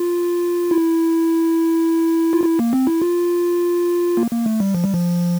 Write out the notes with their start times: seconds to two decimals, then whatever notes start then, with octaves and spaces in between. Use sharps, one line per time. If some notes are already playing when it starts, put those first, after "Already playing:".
Already playing: F4
0.71 E4
2.33 F4
2.44 E4
2.59 A#3
2.73 C4
2.87 E4
3.02 F4
4.17 A#3
4.31 A#3
4.46 A3
4.60 G3
4.75 F3
4.84 G3
4.94 F3